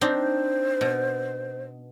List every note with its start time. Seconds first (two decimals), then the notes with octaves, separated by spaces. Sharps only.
0.01 C4 D4 D#4 C5
0.81 B2